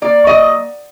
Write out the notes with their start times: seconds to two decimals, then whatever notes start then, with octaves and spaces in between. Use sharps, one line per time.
0.02 A#3 D5
0.27 F#3 D#5